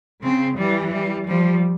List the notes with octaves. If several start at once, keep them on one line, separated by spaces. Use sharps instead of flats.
C#3 C4
E3 G3
G3
F3 G3